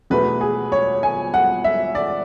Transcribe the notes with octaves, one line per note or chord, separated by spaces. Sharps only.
E2 B2 A3 B4
G#4
C#5
G#5
F#5
E5
D5